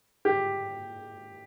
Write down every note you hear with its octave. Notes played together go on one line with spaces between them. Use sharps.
G4